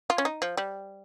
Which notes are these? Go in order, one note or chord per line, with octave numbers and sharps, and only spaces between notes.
F4
C#4
D#4
F3
G3